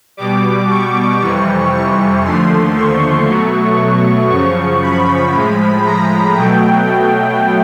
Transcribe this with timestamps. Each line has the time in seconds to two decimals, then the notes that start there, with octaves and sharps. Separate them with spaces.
0.17 B2 G3 D6
0.69 C#6
1.20 F2 C3 E3 G3 C#6
1.73 C#6
2.23 D#2 D3 F3 A3 C6
2.75 C#6
3.27 B2 F#3 A3
4.30 F#2 C#3 F3 C#6
4.82 B5
5.34 A2 F3 G#3
5.85 A#5
6.37 B2 F#3 A3 G5